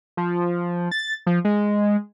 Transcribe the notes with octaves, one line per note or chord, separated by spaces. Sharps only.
F3
A6
F3
G#3